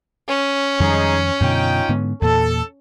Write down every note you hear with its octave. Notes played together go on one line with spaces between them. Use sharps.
C#4
F2 D#3 G3 G#3 D#4 G#4
F#2 B2 D3 D#4 F4 G5
G#2 D3 B3
E2 A#2 A4